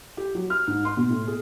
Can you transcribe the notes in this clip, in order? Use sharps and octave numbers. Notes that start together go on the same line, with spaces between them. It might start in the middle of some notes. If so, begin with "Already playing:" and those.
G4
F#3
F6
G#2
C6
B2
A2
G#4